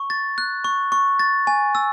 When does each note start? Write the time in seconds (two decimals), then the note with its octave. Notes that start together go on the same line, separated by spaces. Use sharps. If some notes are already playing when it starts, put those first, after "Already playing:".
Already playing: C#6
0.10 A6
0.38 F#6
0.64 C#6
0.92 C#6
1.19 A6
1.47 G#5
1.75 E6